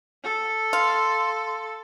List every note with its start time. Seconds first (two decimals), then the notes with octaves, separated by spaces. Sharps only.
0.24 A4
0.73 F5 C6